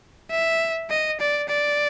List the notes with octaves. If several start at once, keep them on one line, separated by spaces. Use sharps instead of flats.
E5
D#5
D5
D5